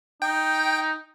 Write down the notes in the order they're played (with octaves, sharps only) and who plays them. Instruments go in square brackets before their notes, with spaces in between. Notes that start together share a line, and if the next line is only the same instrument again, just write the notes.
[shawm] D#4 [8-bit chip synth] G5